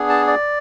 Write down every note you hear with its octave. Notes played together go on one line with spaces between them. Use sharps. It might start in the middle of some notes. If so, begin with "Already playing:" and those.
Already playing: B3 D4 G#4
A5
D5